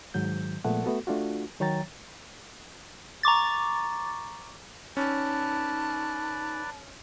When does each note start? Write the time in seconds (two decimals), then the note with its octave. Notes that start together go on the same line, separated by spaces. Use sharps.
0.14 G#2 D#3 F#3 G6
0.65 A#2 F3 G#3 A3 B3 F#5
0.84 A3 B3 F#4 A4
1.07 A3 D4 F4 F#4
1.60 D#3 F#3 C#5 G5 A#5 A6
3.23 A#5 C#6 D6 A6
4.97 C#4 D#4 B4 D5 A5